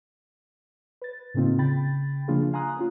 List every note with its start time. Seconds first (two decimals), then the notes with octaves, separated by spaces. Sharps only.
1.02 B4 A6
1.34 A2 C#3 A#3 C4 D#4 F4
1.58 C#3 G5 B5 A6
2.28 C#3 F3 A#3 D4 F4 G#4
2.53 F5 G#5 A#5 C6 D#6 F#6
2.77 A#3 C#4 F4